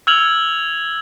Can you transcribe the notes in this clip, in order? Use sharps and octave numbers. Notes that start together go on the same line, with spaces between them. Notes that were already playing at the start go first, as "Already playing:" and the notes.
E6 F6 G#6 F7 F#7